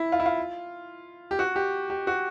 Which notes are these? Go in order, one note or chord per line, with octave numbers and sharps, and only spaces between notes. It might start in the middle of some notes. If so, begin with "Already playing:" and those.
Already playing: E4
F4
E4
F4
G4
F#4
G4
G4
F#4